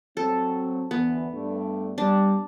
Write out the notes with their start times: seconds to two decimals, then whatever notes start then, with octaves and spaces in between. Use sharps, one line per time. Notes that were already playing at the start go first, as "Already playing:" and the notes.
0.17 F#3 C4 A4
0.91 D2 D3 E3 B3
1.33 G2 A3 D4
1.98 G3 D4